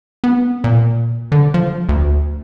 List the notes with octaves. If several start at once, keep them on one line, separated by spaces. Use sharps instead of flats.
B3
A#2
D3
F3
D2